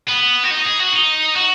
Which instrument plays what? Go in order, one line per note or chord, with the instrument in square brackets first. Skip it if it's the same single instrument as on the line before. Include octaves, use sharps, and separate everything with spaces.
[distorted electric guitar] B3
F#4
D#4
G#4
F#4
D#4
F#4